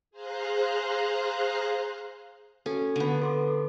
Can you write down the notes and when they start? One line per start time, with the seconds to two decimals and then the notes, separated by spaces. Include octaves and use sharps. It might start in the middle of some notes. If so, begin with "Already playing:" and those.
0.11 G#4 C5 F5 A#5 C6 F#6
2.66 C#4 F#4 A4
2.96 D3 B3
3.22 A4 C6 D6